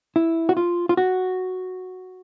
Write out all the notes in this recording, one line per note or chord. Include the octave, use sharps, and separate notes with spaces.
E4
F#4
F4
F4
F#4